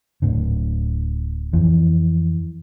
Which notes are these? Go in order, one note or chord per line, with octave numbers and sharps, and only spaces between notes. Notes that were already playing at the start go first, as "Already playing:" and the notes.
D1 A2 D3
F2 E3